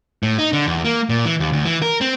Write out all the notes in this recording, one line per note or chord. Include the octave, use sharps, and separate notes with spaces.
A2
D#4
D3
E2
A#3
A#2
E3
D#2
D2
E3
A#4
C4